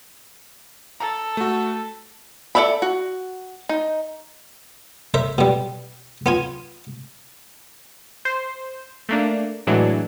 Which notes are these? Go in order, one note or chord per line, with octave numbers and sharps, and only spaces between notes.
A4 A#5
A3 F#4
A4 A#4 D5 E5 B5
F#4
D#4
A#4 C5 E5
B2 G3
B3 F4 G#5
C5
A3 A#3 D4
A2 E3 F#3 G#3 D4